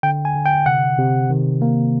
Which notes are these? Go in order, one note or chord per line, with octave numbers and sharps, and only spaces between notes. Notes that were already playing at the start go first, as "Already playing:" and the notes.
D3 G5
G#5
D3
G5
C3 F#5
C3
D#3
A#3